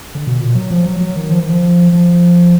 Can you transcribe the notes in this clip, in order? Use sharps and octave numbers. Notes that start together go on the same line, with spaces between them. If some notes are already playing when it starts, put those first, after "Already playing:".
D3
B2
A#2
F#3
F3
F#3
F#3
D#3
F3
D#3
F3
F3